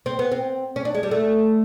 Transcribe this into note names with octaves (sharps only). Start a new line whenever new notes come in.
C4
B3
C4
C#4
D4
G#3
G3
A3